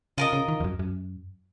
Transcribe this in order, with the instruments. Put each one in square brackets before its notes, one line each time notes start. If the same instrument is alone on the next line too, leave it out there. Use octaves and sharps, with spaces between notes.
[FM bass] C#3 [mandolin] F4 A#4 D#5
[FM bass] C#3
D#3
F2
F#2
F#2